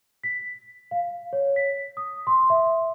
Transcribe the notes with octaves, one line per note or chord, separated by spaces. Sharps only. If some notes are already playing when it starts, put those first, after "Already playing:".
B6
F5
C#5
B6
D#6
C6
E5